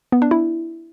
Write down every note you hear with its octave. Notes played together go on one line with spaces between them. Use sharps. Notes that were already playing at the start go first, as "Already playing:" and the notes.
B3
D4
E4